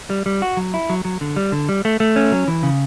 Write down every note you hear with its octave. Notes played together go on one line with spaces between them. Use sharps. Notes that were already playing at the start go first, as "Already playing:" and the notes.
G3
G3
F#4
F#3
E4
F#3
F#3
D3
G3
D3
G3
A3
A3
C#4
F#3
E3
C#3